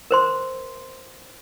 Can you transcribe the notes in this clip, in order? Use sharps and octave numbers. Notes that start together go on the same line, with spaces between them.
A#4 C5 C6